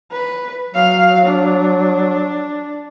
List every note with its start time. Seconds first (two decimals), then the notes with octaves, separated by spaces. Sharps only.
0.12 B4
0.74 F#3 F5
1.26 D4